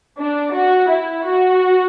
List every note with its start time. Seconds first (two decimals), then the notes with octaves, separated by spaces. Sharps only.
0.18 D4
0.54 F#4
0.90 E4
1.26 F#4